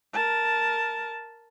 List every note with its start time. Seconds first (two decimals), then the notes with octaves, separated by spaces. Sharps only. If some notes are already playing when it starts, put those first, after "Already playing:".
0.13 A#4 A5